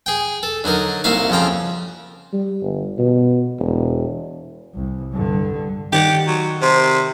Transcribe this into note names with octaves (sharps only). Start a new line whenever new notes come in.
G#4 G5
A4
D3 F#3 D#4 A#4
C2 A#3 F#4 E5 F5
F2 C#3 F3 G5 A#5
G3
G1
B2
E1
C2
G2 D3
D#3 G4 D5 F#5
F#3
C3 C5